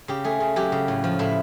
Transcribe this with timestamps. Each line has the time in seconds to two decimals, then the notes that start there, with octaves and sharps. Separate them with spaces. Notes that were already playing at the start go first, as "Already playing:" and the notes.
0.08 C#3 G4
0.24 A3 G#4
0.40 C#3
0.56 F#3 G4
0.72 C#3
0.88 A2
1.04 F3
1.19 A2 E4